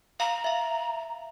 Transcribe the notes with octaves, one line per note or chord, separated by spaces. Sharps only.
F5 A#5
E5 F5